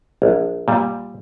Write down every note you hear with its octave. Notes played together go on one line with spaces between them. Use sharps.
A#1
A#2 G3